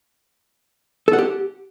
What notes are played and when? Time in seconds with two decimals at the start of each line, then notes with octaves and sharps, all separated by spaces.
1.08 A4
1.13 F#5
1.19 G4